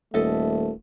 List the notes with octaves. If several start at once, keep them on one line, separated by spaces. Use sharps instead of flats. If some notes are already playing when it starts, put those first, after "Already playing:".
D#1 A3 A4 D#5 E5